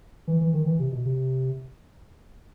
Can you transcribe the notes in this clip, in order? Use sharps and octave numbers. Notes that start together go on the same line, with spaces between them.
E3
E3
D#3
E3
C3
B2
C3